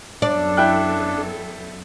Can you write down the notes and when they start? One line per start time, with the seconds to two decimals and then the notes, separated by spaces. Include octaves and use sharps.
0.22 F#2 B3 D4 A4 D5
0.57 E4 G5 F#6